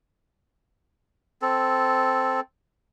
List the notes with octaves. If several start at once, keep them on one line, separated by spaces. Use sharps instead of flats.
C4 A4